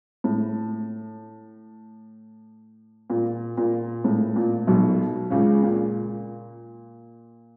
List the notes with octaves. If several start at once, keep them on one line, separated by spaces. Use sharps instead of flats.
A2
A#2
A#2
A2
A#2
B1 B2
C#2 C#3
A#2